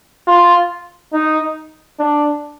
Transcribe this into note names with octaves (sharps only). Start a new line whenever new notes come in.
F4
D#4
D4